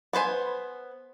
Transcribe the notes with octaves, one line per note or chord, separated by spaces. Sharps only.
B3 B4 C5 G#5